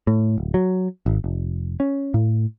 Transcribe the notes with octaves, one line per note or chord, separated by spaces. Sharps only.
A2
D1
F#3
G#1
F1
C#4
A2